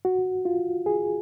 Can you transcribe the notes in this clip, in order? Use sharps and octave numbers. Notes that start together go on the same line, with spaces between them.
F#4
F4
G#4